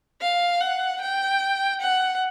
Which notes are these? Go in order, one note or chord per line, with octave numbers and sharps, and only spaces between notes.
F5
F#5
G5
F#5